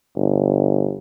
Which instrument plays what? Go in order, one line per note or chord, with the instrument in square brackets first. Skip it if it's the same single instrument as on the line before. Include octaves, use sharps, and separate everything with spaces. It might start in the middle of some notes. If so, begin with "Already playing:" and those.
[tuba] G1